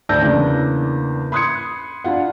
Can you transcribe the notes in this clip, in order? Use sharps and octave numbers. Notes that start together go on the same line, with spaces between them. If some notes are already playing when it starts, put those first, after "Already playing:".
D2 D5 A5 E6 G6 A#6
E2 C#3 A#3 D4
B5 C6 D#6 F#6 G#6 C#7
D4 E4 F4 F#5